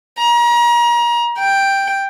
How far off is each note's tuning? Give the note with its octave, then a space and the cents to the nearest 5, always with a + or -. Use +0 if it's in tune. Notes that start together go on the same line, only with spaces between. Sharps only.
A#5 +35
G5 +5